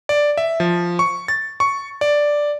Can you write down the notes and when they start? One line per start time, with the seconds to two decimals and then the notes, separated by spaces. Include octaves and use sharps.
0.09 D5
0.37 E5
0.60 F3
0.99 C#6
1.28 A6
1.60 C#6
2.01 D5